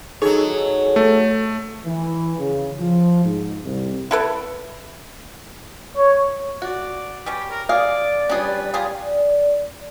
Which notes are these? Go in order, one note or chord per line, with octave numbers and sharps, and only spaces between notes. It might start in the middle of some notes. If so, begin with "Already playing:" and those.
F#3 D#4 G#4 A4 C#5
A3
E3
C#3
F3
G#2
C2
E4 A4 B4
C#5
F#4 D5
G3 C#4 G4
A#4
G#4 D5 F5 D6
G3 C#4 D4 G#4 B4
F4 G4 G#4
D5